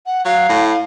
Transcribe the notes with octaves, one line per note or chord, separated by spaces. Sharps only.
F#5
F#3 F5
A2